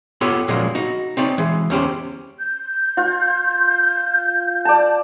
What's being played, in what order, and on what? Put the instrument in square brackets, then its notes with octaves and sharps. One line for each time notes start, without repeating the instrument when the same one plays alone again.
[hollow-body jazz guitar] B3 F4 G4 A4 C#5 F#5
A#2 C#3 F3 F#3 G#3 A#3
D#4 F#4
C4 D#4 C#5 D5
E3 G#3
E2 C#4 G4 C5
[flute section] G6
[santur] F4
D5 A5